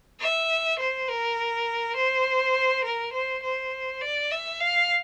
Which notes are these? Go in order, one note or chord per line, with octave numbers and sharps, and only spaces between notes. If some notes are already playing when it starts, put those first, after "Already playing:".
E5
C5
A#4
C5
A#4
C5
C5
D5
E5
F5